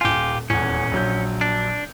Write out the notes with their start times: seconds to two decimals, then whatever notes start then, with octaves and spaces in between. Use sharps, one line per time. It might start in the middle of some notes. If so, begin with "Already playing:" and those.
0.01 D#1 F4 G4 G#5
0.50 D#1 E2 C#4
0.92 A#1 F#3 G6
1.41 D4